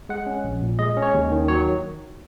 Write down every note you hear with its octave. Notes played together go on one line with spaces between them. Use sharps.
G#3 F#5
C#4
A#1
A#2
G#3 D#5
C#4
C#5
D#2
D#3
F#3 C#5